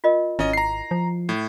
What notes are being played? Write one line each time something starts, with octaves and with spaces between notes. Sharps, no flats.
F4 A#4 D#5
G#1 C#4 E4 D#5
A#5 C7
F3
A2